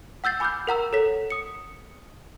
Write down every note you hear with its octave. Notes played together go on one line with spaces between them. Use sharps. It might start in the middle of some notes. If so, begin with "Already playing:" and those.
F#5 E6 G6 A6 C7
G#5 B5 D6 E6 F6 G6
A#4 F#5 A#5 E6
A4 C#5 B6
D#6 C#7